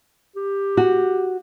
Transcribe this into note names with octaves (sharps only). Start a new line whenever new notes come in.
G4
F#4